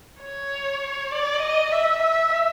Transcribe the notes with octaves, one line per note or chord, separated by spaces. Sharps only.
C#5
D5
D#5
E5
E5